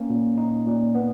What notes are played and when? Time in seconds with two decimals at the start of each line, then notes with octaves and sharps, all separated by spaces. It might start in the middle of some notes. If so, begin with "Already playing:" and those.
Already playing: A#3 C#4
0.10 A#2
0.38 D#4
0.66 A#2
0.95 B3